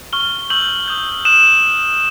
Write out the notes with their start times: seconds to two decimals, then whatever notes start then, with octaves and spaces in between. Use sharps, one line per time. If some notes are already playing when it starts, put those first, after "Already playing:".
0.13 C#6 F6 G7
0.50 C#6 E6 G6 F#7
0.88 D#6 G6
1.25 D#6 F#6 E7